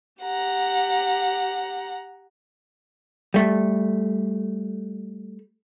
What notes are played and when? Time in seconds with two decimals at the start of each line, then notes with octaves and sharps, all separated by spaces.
0.19 G4 F#5 A#5
3.34 G3 A3